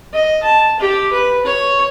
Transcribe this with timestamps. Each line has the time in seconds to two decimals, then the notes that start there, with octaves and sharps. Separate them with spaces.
0.13 D#5
0.43 A5
0.80 G4
1.13 B4
1.45 C#5